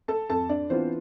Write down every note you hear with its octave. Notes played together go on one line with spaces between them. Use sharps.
A4 A5
F2 A4 A5
D4 D5
E3 B3 C4 D4 F4 C5